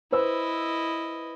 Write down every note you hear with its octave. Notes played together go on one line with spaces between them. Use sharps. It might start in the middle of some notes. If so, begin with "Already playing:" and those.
E4 B4 C5 D#5 E6